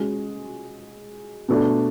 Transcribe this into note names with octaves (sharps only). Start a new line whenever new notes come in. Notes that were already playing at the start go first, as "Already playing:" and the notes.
Already playing: G#3 C#4 F#4
B2 A3 D4